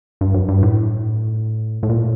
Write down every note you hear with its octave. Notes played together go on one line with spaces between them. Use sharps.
G2
F#2
G2
A2
A2
A#2